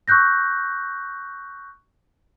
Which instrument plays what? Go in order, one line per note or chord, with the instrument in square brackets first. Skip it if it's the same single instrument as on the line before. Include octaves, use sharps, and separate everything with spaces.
[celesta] C#6 E6 F#6 G6 A#6